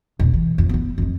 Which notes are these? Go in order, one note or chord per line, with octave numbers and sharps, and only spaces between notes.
E1 A#2
E3
F2
B3 E4
F2 D#3